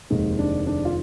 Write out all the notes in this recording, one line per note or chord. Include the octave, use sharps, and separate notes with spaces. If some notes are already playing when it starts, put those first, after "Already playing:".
F1 D#2 D#3 G#3
D4
D4
F4